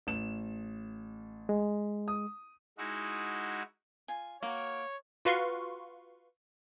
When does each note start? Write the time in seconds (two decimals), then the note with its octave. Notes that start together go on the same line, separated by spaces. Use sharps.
0.07 A1 E7
1.49 G#3
2.08 D#6
2.78 G#3 D#4 E4 F#4
4.08 F4 G#5
4.43 A#3 F#4 A#4 C#5
5.25 F4 F#4 B4 F5 C6 C#6